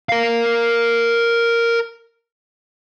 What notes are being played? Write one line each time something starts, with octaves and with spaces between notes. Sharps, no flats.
A#4 F5